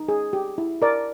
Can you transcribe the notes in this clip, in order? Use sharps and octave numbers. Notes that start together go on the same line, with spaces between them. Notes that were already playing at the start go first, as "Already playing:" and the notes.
Already playing: D#4
G#4
G4
E4
A#4 D5